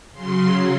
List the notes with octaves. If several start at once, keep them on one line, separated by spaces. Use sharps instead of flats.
C#3 F#3 C6